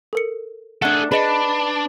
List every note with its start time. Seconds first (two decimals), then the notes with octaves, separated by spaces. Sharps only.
0.13 A4 A#4 C#7
0.82 A3 D4 G#4 A4 F#5 F#6
1.12 D4 G#4 B4 D#5 C#7